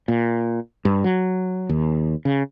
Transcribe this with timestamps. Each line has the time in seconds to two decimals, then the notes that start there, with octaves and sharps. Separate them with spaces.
0.08 A#2
0.85 G2
1.04 F#3
1.69 D#2
2.25 C#3